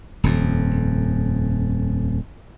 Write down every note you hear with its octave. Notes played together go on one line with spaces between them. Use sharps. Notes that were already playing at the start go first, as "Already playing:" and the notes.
D#1 F2